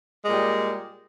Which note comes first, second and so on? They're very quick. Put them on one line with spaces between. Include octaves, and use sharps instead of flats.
G#3 A#2 G3